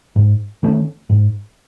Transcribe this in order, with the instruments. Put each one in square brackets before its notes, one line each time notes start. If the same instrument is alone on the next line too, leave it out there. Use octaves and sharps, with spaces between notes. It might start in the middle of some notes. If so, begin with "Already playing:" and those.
[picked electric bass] G#2
D#3 A3 C#4
G#2